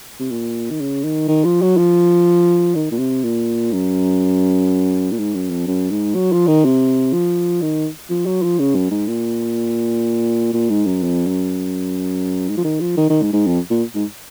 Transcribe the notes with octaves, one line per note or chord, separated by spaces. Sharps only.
C3
A#2
D#3
C#3
D#3
D#3
F3
F#3
F3
D#3
A#2
C3
A#2
F#2
A#2
G#2
F#2
F2
F#2
G#2
F#3
F3
D#3
C3
F3
D#3
F3
F#3
F3
C#3
F#2
G#2
A#2
A#2
G#2
F#2
F2
F#2
G#2
F3
D#3
F3
D#3
D#3
G#2
G#2
F2
A#2
G#2